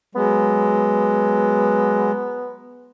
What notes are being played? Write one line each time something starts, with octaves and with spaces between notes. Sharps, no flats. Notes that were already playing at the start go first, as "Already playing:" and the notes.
F#3 G#3 B3